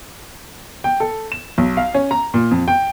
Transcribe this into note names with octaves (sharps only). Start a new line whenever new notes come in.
G5
A4
E7
B1
F5
C#4
A#5
A#2
F2
G5